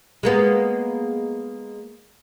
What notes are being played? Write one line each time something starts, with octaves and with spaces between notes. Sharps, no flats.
G#3 A#3 B3